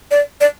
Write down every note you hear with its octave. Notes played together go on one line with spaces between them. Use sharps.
D5
D5